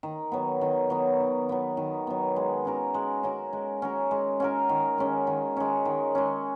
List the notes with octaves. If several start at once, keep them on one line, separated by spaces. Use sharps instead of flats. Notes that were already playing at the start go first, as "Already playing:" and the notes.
D#3
F#3 B3
D#3
F#3 B3
D#3
F#3 B3
D#3
F#3 B3
G#3
C#4 F#4 A#4
G#3
C#4 F#4 A#4
G#3
C#4 F#4 A#4
G#3
C#4 F#4 A#4
D#3
G#3 C#4
D#3
G#3 C#4
D#3
G#3 C#4